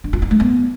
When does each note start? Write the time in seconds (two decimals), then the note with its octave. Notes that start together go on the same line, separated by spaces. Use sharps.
0.04 D4
0.13 F4
0.22 E4
0.31 A3
0.40 B3